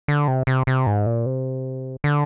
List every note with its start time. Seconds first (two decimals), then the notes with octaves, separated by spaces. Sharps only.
0.08 D3
0.28 C3
0.47 C3
0.67 C3
0.87 G#2
1.06 A#2
1.26 C3
2.04 D3